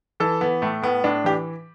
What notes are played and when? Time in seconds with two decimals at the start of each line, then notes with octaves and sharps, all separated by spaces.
0.20 E3 A4
0.41 E3 B3
0.62 A2 A3
0.82 A2 B3
1.04 A2 D4
1.24 E3 G4